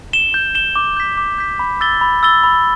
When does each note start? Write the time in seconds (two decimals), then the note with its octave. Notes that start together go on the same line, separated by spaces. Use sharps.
0.13 E7 G7
0.34 G6
0.55 E7 G7
0.76 D6
0.97 G6 B6
1.17 D6
1.38 G6 B6
1.59 B5
1.81 E6 A6 G7
2.01 B5
2.23 E6 A6 G7
2.44 B5